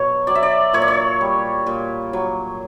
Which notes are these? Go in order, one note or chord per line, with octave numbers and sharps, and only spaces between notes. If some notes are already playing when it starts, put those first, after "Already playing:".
Already playing: B2 F#3 C#5
F#3 D5
E5
D5
A#2 C#5
D5
C#5
G3
A#2
F#3